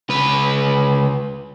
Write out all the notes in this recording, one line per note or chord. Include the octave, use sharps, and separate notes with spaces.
C#2 B4